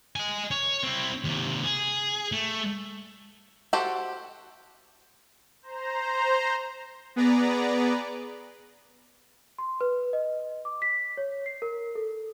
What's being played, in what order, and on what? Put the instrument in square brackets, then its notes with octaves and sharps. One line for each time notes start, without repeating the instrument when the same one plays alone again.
[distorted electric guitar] D#5 G#5
C#5
C4 E4
D#2 C3
G#4
A3
[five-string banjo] F#4 G4 A4 C5 F#5
[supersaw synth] C5 A#5
B3 G#4 B4 D5 A#5
[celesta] C6
B4
D#5
D6
B6
C#5
C7
A#4
A4